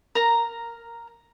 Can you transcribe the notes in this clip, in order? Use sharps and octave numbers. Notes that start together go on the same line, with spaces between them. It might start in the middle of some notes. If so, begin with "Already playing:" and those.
A#4 A#5